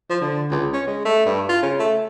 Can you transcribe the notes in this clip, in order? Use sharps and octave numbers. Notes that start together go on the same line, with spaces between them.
F3
D3
C#2
C#4
G#3
A3
G2
F4
C#3
A3